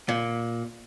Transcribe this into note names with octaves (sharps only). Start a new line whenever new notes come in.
A#2